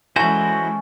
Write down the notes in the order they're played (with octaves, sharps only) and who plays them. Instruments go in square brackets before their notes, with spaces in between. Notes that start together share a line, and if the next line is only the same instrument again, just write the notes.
[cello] E3 G#3 [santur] A3 C#4 [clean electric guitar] E4 F#4 C5 [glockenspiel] G#5